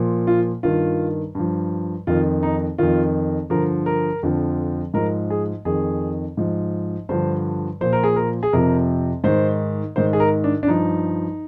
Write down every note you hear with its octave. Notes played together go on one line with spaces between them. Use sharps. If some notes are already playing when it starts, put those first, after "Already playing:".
Already playing: A#2 F3
F4
G2 D#3 F4
G2 F3
F2 D#3 F4
D#4
F2 D#3 F4
G2 D3 F3 A#4
A#4
F2 D3 F3
G#2 F3 A#4
G#4
F2 D#3 G#4
G#2 F3
G2 D3 F3 C5
A#2 F3 C5
A#4
G#4
A#4
G#4
F2 C3 F3 A#4
G#2 D#3 C5
G#2 D#3 C5
G#4
A#4
D4
D4
G2 F3 D#4